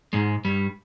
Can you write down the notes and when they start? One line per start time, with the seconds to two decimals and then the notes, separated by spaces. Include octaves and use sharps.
0.13 G#2 G#3
0.45 G2 G3